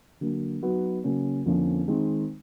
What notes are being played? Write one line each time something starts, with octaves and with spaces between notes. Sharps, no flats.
D3 F#3 A#3
F#3 B3 D#4 F#4 B4
C#3 F#3 A#3 C#4
F2 D3 F3 A#3 C#4
D#3 G#3 C4